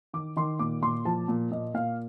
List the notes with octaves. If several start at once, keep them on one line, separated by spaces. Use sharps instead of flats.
D#3 D6
D#3 C6
A#2 D6
A#2 C6
F3 A5
A#2
A#2 D#5
A#2 F5